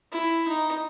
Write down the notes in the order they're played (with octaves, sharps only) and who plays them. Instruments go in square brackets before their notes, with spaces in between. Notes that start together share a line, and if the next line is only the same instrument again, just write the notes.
[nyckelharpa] E4
D#4